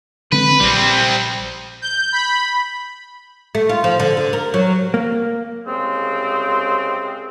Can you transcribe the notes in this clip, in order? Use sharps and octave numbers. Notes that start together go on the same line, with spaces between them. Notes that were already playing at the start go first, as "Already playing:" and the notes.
D3 G#3 C4 B4
A#1 G3 C4
G6
B5
A3
F4
F3
D3
D3
A#4
F#3
A#3
C2 C#3 G#3 C4